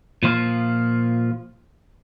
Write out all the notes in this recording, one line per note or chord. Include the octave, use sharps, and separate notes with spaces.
A#2 F3 F4